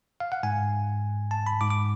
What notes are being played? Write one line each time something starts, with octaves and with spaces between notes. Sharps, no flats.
F5
F#5
G#2 G#5
A5
B5
G#2 D6
D6